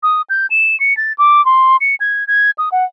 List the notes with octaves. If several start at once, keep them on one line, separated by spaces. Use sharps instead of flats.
D#6
G6
E7
C#7
A6
D6
C6
C#7
G#6
G#6
D#6
F#5